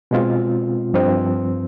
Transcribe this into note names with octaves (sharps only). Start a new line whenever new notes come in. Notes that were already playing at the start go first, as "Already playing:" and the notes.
B2 G#3 C4 F4
G2 F3 C4